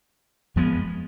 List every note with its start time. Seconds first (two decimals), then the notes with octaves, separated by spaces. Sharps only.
0.56 F2 F3 G#3 B3